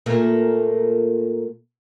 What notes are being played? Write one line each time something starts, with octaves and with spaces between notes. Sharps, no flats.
A#2 A3 A#3